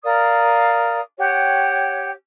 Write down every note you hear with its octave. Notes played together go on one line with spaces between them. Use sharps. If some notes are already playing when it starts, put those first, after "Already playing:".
A#4 D5 F5 D#6
G4 C#5 F#5 G5